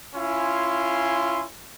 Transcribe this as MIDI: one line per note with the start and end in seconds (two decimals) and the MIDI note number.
0.16 1.44 61
0.16 1.44 64
0.16 1.44 65
0.16 1.44 80
0.16 1.44 84